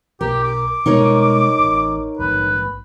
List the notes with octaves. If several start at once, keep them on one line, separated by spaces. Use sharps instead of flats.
B1 G4 A#4
D6
B2 G3 G#3 D#4 A#4 C#5
A1
A#1 G#2 B4